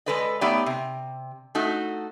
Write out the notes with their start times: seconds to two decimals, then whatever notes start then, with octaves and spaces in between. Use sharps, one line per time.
0.06 G#3 A3 A4 B4 D5 D#5
0.41 A3 B3 D#4 G4 C#5 D5
0.66 C3
1.55 A3 D#4 F#4